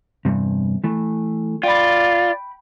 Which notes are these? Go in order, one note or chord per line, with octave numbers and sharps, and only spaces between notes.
E2 G2 C3
E3 A3
F4 D5 G5 B5